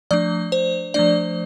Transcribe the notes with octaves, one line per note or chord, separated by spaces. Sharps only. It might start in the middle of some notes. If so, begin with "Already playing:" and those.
F3 A3 D4 D5
C5
F3 A3 D4 D5